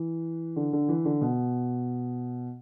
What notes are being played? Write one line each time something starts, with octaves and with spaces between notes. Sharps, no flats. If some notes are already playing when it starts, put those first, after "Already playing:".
Already playing: E3
D3
D3
E3
D3
B2